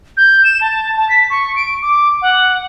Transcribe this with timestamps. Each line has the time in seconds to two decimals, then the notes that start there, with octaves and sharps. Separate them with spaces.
0.17 G6
0.44 E7
0.61 A5
0.97 A5
1.09 B6
1.30 C#6
1.56 D7
1.82 D6
2.22 F#5